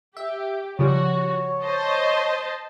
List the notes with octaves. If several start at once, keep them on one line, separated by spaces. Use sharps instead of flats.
G4 E5
C#3 F3 G3 F#4 C#5
C5 D#5 A5